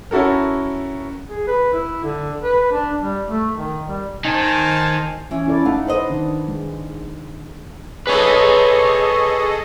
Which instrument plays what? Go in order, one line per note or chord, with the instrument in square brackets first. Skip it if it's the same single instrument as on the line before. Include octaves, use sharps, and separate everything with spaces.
[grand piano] C#4 E4 F#4 A4 A#4
[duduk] G#4
B4
E4
D3
B4
D4
G3
A3
D#3
G3
[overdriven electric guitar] D#3 D#4 [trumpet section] C5 G#5 A5
[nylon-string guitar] E3 C#4
[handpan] E4 A4 D5
[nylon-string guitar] A3 F5 A5 [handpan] D#4 F#5
[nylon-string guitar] B4 C5 D#5
[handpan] D#3 D4
G#3
[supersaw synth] G#4 A4 D#5 [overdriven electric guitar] B4 C#5